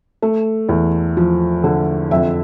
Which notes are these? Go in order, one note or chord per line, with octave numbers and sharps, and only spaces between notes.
A3
E2
F3
D3
F2 E5